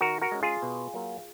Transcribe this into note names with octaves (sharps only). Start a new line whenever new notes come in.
D#3 F#4 A#4
F#4 A#4
G#3 C#4
F4 G#4
B2
F#3 A#3